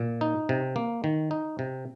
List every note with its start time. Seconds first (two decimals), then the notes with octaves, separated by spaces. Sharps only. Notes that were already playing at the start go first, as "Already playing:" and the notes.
Already playing: A#2
0.21 D#4
0.49 C3
0.76 A#3
1.04 D#3
1.31 D#4
1.59 C3